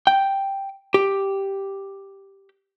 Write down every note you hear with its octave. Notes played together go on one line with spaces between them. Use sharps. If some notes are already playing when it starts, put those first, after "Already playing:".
G5
G4